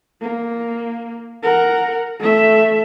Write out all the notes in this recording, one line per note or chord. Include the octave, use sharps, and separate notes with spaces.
A#3
A#4 F#5
A3 E5